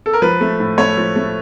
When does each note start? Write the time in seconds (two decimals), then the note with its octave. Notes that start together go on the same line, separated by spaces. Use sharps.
0.06 A4
0.13 A#4
0.22 F3 B4
0.41 A3
0.60 A2
0.78 A3 C#5
0.97 F3
1.16 A3